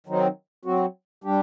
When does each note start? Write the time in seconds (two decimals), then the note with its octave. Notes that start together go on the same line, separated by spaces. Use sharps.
0.07 D#3 F#3 C4 D#4
0.65 F#3 C4 F#4
1.24 G3 D4 G4